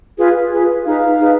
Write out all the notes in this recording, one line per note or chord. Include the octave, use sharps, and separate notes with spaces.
F4 G#4 B4
F4 G#4 B4
D#4 G#4 B4 F5
D#4 G#4 B4